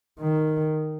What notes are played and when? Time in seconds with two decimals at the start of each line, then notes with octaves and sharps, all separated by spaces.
0.20 D#3